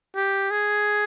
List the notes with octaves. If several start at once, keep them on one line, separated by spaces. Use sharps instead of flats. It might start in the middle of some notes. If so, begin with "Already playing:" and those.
G4
G#4